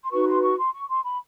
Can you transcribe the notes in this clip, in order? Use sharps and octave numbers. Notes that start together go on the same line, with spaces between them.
C6
D#4 F#4 B4 C#6
C6
C#6
C6
C#6
C6
B5